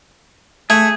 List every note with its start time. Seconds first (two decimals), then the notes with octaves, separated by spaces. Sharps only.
0.70 A3 G#4 G#6